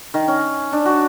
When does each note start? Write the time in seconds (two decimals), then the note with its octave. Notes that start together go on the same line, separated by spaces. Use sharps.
0.14 D#3
0.28 C#4
0.72 D4
0.85 F#4